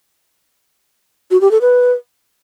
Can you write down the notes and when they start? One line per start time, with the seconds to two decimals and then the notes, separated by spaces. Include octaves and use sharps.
1.31 F#4
1.41 G4
1.51 A4
1.61 B4